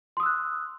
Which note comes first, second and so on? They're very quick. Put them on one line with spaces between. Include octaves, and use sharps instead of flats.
C6 D#6 E6 F#6